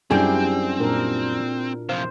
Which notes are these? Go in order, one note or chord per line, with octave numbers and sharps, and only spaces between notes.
F#2 G3 C4 D4 E4 G4 G#4
A#2 D4 A#4
C3 F3 C5 F5